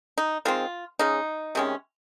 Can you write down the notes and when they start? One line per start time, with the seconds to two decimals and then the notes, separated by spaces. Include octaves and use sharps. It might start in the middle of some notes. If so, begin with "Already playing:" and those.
0.18 D#4
0.45 D#3 G#3 C4 F4
0.99 C#3 G#3 C#4 D#4
1.55 C3 D#3 G#3 C#4